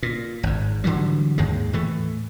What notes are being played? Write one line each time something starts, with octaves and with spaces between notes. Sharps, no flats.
A#2
G#1 G#2
D3 E3 F#3 G3
D#2 G#2 G#3
A2 E3 A3